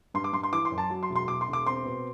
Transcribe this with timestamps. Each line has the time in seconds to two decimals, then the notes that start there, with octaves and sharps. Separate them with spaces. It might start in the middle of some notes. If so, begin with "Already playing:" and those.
0.14 G2 C6
0.24 D6
0.33 G2 C6
0.43 C6
0.52 E3 D6
0.65 C6
0.71 F#2
0.78 A5
0.90 F#3
1.03 C6
1.09 E1
1.16 C6
1.28 E1 D6
1.41 C6
1.48 E1
1.53 D6
1.66 C4 C6
1.85 B2